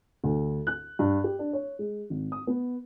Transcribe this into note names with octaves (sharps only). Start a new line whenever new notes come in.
D2
F#6
G2
G4
D4
C#5
G#3
G#1
D#6
B3